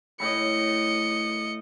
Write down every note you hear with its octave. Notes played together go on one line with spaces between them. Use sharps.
A2 D#5 B5 C#7